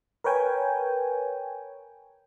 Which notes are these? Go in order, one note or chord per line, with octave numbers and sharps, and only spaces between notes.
A#4 B4 C#5 G5 G#5